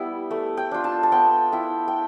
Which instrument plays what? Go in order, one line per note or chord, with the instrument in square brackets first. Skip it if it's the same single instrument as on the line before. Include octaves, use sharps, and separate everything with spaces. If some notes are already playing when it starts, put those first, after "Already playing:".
Already playing: [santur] G3 B3 E4 G5
A3
G5
D4 F4
A5
A5
B3 G5
E4 G5
G5